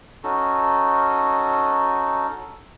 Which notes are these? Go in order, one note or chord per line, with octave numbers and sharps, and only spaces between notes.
C#4 D#4 F#4 A4